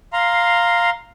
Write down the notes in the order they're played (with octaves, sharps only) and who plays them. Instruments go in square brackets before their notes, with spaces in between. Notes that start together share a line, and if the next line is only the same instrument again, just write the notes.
[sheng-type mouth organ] F5 A#5 C6